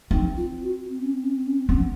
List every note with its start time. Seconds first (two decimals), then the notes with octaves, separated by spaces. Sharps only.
0.11 C4 D#4
0.37 F4
0.63 F#4
0.90 C4
1.02 C#4
1.13 C4
1.24 C#4
1.36 C4
1.47 C#4
1.58 C4
1.69 B3 C#4